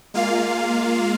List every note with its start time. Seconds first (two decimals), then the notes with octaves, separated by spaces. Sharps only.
0.14 G#3 A#3 F4 F5